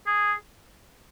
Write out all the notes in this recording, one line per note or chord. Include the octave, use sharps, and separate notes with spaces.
G#4